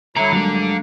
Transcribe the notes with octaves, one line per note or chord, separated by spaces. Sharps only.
G2 D3 F#3 E4 A#5
D3 F#3 G#3 A#3